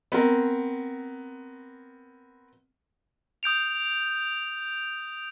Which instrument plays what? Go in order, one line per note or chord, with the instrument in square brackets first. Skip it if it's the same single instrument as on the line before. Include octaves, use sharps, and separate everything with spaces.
[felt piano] B3 C4 A#4
[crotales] D#6 G6 D7 F7